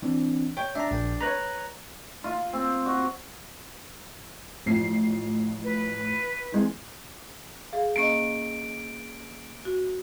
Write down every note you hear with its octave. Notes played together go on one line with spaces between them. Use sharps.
E3 C4 D4
C#5 G5
D4 E5 A#5
A#1 G5
B4 C#5 A#5 F#6
F4
C4
F#4
A1 F3 C7
B4
E3 G#3 C4
G#4 F5
A#3 C#4 D#5 D7
F#4